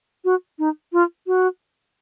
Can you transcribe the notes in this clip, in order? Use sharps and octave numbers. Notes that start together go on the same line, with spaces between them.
F#4
D#4
F4
F#4